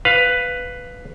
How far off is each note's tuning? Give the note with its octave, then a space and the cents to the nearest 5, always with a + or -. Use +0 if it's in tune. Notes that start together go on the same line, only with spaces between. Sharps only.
B4 +5 F5 +5